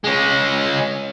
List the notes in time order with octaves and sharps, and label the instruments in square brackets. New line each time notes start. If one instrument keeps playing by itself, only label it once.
[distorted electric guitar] G#3 C#4